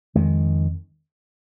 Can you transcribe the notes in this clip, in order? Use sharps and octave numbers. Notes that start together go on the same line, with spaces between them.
F2 D#3 G#3